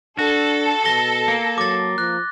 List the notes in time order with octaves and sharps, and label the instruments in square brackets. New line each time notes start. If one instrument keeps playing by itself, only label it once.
[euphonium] D4 [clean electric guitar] F#4 [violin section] A4
[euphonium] B2 [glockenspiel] A#6 G7
[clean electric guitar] A#3
[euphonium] F#3 [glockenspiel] D6 A6
[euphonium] F3 [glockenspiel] F#6